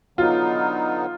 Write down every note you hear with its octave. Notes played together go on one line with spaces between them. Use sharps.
D3 F#3 B3 D#4 F4